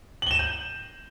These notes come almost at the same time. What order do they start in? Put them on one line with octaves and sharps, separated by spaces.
F#7 G7 E7 D#7 G6